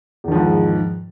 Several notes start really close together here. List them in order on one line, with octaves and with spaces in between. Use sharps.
E2 D#3 F3 G#2